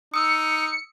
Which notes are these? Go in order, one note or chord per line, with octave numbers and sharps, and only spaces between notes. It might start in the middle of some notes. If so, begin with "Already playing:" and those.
D#4 D#6 E6 C#7